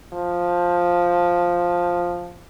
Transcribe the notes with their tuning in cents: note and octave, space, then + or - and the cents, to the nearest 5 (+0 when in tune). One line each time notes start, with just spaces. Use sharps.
F3 +5